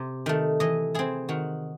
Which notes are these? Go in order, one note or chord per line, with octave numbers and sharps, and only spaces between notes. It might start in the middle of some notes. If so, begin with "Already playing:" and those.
Already playing: C3
D#3 A3
E3 D#5
C4 E4 G#4
D#3 F#4